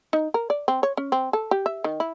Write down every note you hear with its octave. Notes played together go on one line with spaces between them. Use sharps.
D#4
A#4
D5
C4
C#5
C#4
C4
A4
G4
E5
D#3
E4